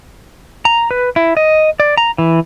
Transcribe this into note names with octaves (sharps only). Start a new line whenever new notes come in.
A#5
B4
E4
D#5
D5
A#5
E3